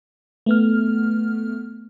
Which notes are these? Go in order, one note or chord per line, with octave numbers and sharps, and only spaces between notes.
A3 B3 F6